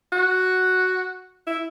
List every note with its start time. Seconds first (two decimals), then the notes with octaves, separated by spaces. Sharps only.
0.12 F#4
1.47 E4